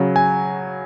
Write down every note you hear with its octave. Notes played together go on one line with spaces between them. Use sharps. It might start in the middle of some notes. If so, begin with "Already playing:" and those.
Already playing: C#3 F#3
G#5